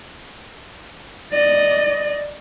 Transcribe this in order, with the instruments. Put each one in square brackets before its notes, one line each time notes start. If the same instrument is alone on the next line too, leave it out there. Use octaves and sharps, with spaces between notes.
[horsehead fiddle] D5 D#5